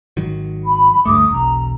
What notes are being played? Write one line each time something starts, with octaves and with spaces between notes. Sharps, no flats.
G#1 D#3 F#3
B5
D2 G2 A3 D6 D#6
E1 B1 A#5